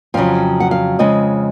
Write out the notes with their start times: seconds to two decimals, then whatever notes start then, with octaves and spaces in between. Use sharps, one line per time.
0.14 F2 C#3 F#3 F5
0.60 F#5
0.71 F5
0.99 F2 C#3 G#3 D#5